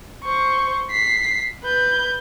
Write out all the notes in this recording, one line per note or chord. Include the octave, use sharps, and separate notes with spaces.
C5 C#6
B6 C7
B4 G6